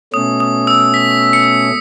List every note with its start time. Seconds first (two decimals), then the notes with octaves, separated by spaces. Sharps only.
0.14 B2 A3 C#4 D#6
0.40 D#6
0.67 E6
0.94 B6
1.33 C#7